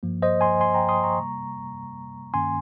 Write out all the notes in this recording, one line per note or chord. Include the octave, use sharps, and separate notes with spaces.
G2 F3 A#3
C5 D#5
G#5 C6
G#5 C6
G5 A#5
C6 D#6
A#5 C#6
C3 G3 A#3
G2 D#3 A#3 C#4 G#5 C6